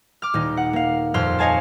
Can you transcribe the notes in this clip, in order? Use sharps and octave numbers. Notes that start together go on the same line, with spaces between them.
D6 F6
D#1 D#4
F#5
A#3 F5
D#1 F2 C6 F6
C#5 D#5 F5 G#5 A5